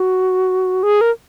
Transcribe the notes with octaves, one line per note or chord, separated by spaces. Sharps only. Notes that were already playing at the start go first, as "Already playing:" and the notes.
Already playing: F#4
G#4
A#4